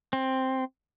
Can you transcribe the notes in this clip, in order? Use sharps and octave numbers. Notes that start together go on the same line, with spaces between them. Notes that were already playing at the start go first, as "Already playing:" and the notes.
C4